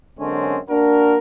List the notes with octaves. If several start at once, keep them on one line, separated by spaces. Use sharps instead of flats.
F#2 D3 G#3 C4 C#4
A#3 D4 F#4 A#4